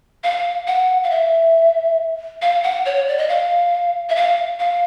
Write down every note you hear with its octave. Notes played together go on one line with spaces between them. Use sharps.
F5
F#5
F5
E5
F5
F#5
C#5
C#5
D5
D#5
F5
E5
F5
F5